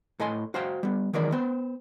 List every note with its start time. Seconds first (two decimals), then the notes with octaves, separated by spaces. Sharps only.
0.20 A2 A4 D#5 G#5 C6
0.54 F#4 C5 F5 G5
0.83 G3 B3
1.13 D#3 E3 F#3 G#3 A#4 D5
1.32 B3 C5 G5